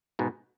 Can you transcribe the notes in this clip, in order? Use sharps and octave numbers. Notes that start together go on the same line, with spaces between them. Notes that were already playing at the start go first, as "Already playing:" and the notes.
G#2 B2